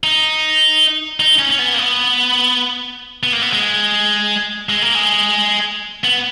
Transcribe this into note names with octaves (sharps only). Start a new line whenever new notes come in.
D#4
D#4
C#4
C#4
B3
A#3
B3
B3
A#3
B3
G#3
G#3
A#3
G#3
B3